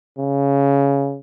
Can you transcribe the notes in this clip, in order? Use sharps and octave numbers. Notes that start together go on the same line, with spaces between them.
C#3